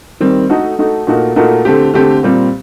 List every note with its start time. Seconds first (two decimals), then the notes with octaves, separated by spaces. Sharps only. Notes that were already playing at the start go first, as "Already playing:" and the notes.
0.21 D#3 G3 C4
0.50 A3 D#4 F#4 A4
0.79 A3 D#4 F#4 A4
1.07 A#2 A3 D#4 F#4 A#4
1.36 A#2 A3 D#4 F#4 A#4
1.65 D3 A3 C4 G4
1.94 D3 A3 C4 G4
2.23 A#2 G3 C4